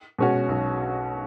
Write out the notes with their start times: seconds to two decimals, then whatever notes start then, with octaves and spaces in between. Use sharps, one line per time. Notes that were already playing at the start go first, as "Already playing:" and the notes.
0.19 B2 G#3 C#4 F#4
0.49 B1